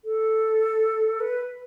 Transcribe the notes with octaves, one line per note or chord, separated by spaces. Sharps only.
A4
B4